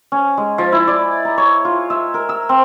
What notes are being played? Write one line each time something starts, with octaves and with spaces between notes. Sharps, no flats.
C#4
G#3
F3
E4
D5
A#5
C#5
F4
E5
A#4
E6
C4